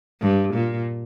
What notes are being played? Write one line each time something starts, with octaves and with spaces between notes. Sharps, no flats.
G2
A#2